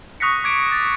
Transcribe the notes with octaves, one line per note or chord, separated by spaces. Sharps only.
C#6 D#6 F#6 A#6 B6 C#7
D6 G#6 D7
A6